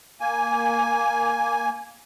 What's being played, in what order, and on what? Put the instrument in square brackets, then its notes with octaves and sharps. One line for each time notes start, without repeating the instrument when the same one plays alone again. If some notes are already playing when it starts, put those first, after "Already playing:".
[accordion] A#3 G#5